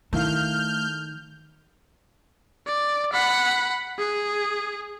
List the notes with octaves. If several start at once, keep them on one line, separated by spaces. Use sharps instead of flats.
D#3 A3 E4 F5 F6 G6
D5
F#5 B5
G#4